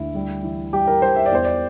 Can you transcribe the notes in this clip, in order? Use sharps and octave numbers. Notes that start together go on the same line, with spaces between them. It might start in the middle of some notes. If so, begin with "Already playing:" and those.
Already playing: D2 E4
G3
E3
G3 G4
A#4
G3 C5
E5
D5
E2 C5
D5